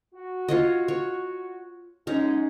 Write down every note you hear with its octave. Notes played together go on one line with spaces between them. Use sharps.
F#4
F4 C#5 D#5
C#5
F#2 G#3 C#4 D#4 A#5